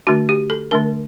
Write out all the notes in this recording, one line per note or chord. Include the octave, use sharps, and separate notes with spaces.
D3 A3 D4 F#4
G4
A4
D3 A3 D4 A#4